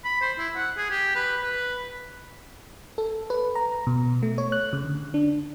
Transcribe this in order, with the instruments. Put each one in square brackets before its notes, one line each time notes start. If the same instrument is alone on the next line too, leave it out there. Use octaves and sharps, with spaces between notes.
[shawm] B5
C5
E4
F#5
G#4
G4
B4
B4
[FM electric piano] A4
B4
A#5
B2
A3
C#5
F#6
C#3
D3
D4